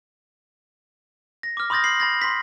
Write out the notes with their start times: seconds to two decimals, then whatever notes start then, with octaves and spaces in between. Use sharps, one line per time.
1.43 A#6
1.57 D6 F6
1.70 B5 C6 D#6 G6 A6 A#6
1.84 C7 F#7
2.00 B5 A6 A#6
2.21 C6 B6